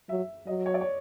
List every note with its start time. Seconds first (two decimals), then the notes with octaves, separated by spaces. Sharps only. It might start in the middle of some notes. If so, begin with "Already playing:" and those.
0.09 F#3 E5
0.47 F#3 D#5
0.66 C#5
0.74 D5
0.81 C#5